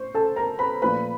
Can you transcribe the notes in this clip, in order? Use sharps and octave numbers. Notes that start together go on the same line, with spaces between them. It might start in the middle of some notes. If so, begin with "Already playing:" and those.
Already playing: A2 C5 C#6
A4 A5
A#4 A#5
B4 B5
A#2 F3 A3 B4 B5